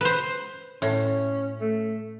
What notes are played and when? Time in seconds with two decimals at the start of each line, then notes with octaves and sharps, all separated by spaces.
0.01 B4 C5
0.82 A2 C#4
1.61 A3